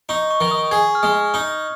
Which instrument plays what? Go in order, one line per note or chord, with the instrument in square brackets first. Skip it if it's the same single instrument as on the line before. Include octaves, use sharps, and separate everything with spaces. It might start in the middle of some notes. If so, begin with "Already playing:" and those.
[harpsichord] D#4 [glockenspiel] C#6
[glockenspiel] C#6
[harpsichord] D#3
[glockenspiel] D#6
[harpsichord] G#4 [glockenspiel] G#6
[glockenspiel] F6
[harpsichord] G#3 [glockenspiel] D#6
[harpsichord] D#4